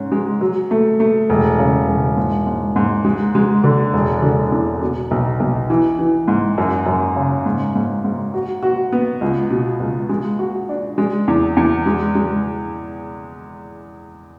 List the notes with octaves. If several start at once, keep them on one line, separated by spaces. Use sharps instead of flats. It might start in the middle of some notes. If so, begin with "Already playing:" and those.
Already playing: G#2 C#4
G#3
F#3
A3
A3
E1
C#3
E1
G#2
G#2
G#2
G#3
G#3
D3
E1
D3
E2
B2
B1
B1
E3
E3
G#2
F#2
F#2
C#3
G#2
G#2
G#2
F#4
F#4
B3
C#2
B2
C#2
G#3
F#4
D4
G#3
E2
E2
G#3
G#3